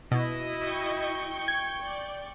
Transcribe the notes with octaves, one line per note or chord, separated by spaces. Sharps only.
B2 E4 F#4 D#5
G5 C#6 G6
G#6
D5